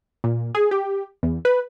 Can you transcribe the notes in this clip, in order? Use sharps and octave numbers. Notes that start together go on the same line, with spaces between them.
A#2
G#4
G4
E2
B4